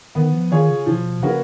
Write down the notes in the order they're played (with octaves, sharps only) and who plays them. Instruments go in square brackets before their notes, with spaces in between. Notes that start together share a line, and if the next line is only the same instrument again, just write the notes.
[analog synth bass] D#3 [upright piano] B3
[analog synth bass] F3
[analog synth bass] D#3 [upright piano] F4 G#4 C#5
[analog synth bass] C#3
[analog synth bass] B2 [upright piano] F3
[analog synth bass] C#3 [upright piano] A#3 C#4 F#4 B4